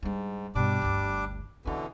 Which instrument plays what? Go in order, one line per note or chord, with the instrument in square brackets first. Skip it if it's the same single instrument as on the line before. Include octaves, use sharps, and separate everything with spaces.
[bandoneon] G#2 [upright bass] G3 D4
[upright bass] G2 B2 [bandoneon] G3 D4 D6
[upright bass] G1 D2
[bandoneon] B2 D3 E3 [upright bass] C#4 D4